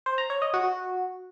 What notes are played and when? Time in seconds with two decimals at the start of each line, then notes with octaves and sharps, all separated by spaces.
0.06 C5
0.18 A#5
0.30 C#5
0.42 D#5
0.54 F#4